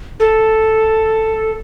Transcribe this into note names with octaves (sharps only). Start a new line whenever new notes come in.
A4